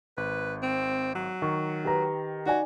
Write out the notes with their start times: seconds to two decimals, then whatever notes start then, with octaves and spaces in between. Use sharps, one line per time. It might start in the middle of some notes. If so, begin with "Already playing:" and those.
0.17 G#1 B4
0.63 C4
1.15 F#3
1.42 D#3 C#6
1.84 G4 B4 A#5
2.46 D#4 F#4 D5 G#5